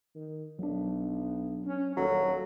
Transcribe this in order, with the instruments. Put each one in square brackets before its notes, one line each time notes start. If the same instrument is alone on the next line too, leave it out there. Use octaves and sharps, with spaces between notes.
[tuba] D#3
[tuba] B1 [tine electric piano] F#3 D4
[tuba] C#4
[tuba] D#1 [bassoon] F#3 [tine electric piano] A4 C#5